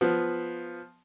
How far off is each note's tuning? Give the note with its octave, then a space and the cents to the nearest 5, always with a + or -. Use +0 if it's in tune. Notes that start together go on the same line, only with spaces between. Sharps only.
F3 +0 B3 +0